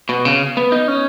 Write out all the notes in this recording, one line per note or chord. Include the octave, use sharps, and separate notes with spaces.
B2
C#3
B3
D#4
C#4